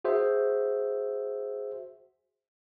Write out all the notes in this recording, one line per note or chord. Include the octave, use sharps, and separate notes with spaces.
F#4 G#4 C5 E5